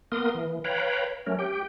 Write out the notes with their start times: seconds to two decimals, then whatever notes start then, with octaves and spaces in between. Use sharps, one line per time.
0.12 A#3 B3 A#4 C6 D#6
0.35 E3
0.64 B4 C#5 F5 G5 A#5 B5
1.27 F#3 A3 C#4 A#4
1.39 G4 G5